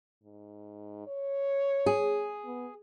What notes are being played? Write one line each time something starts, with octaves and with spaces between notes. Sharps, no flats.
G#2
C#5
G#4
B3